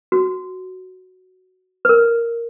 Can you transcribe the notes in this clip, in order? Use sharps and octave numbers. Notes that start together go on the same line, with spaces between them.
F#4
B4
A#4